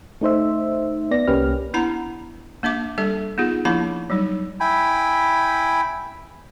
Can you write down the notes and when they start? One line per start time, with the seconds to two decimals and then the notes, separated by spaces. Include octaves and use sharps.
0.21 A3 D#4 C5 E5
1.11 B3 D5 A#6
1.27 C2 A#3 C#4 G4 B4 F6
1.74 B3 D4 E4 F#5 A#5 B5
2.63 A#3 D4 E5 D6
2.98 G3 D4 A4 E5
3.38 B3 D#4 F4 G#4
3.65 F3 A#3 D4 E4 B5 D6
4.10 F#3 G3 D#4
4.60 E4 G5 G#5 B5